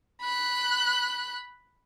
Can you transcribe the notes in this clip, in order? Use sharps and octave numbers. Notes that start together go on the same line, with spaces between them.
B5 F#6